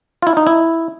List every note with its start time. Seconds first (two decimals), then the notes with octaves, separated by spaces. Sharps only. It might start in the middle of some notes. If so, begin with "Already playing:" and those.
0.23 F4
0.27 E4
0.37 D#4
0.47 E4